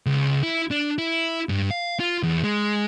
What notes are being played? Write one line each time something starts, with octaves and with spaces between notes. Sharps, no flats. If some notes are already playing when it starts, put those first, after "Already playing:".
C#2
E4
D4
E4
G2
F5
F4
E2
G#3